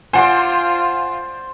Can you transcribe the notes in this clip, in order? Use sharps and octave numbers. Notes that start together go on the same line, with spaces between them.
F4 C5 D5 F#5 G#5 C6